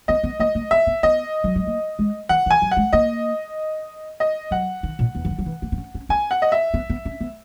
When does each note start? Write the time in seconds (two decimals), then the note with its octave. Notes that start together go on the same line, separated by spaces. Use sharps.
0.08 B3 D#5
0.23 B3
0.40 A#3 D#5
0.55 A#3
0.71 B3 E5
0.87 B3
1.03 B3 D#5
1.44 F#3
1.56 G#3
1.67 A#3
1.99 G#3
2.29 E3 F#5
2.46 E3
2.51 G#5
2.62 F#3
2.71 F#5
2.77 G#3
2.93 A#3 D#5
4.20 D#5
4.51 F#3 F#5
4.83 D#3
4.99 A#2
5.15 E2
5.25 E3
5.30 D#3
5.38 F#3
5.46 E3
5.62 A#3
5.72 B3
5.78 C#4
5.95 C#4
6.09 C#4 G#5
6.31 F#5
6.42 D#5
6.52 E5
6.74 B3
6.90 B3
7.05 C#4
7.21 B3